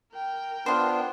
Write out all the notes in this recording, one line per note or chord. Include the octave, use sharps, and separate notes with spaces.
A#4 G5
B3 D4 F4 C5